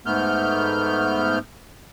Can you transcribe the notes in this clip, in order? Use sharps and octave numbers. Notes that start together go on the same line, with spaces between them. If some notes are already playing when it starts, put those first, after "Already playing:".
G#2 A3 B3 F6 G6